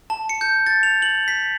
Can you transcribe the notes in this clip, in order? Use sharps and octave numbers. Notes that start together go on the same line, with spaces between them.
A5
C#7
G6
A6
F7
F#7
B6